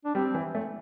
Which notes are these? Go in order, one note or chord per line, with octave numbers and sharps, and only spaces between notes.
D4
G3 C4
E3
A3